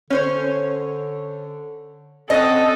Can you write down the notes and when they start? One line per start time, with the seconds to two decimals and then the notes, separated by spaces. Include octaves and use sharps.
0.10 D3 C#4 C5 C#5
2.30 C4 C#4 A4 D#5 F#5